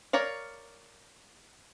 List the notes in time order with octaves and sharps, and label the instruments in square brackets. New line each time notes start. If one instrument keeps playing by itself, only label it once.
[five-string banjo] A#4 C#5 D5 F5